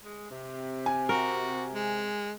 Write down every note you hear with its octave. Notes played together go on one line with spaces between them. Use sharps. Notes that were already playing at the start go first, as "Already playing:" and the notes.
G#3
C3
G#5
F#4 A#4
G#3